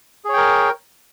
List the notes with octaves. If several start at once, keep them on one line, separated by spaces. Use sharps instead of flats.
G#4 A#4 C#5 G5